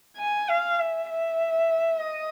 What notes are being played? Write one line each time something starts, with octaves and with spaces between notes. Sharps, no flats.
G#5
F5
E5
E5
D#5